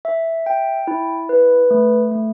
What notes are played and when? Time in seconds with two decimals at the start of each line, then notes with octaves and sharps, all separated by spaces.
0.05 E5
0.46 G5
0.87 E4
1.29 B4
1.71 A3
2.12 A3